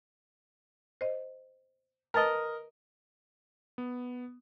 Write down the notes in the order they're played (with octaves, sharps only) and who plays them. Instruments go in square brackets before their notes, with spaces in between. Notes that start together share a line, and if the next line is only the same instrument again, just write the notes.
[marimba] C5 D#5
[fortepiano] A#4 D#5 [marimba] B4 A5 A6
[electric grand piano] B3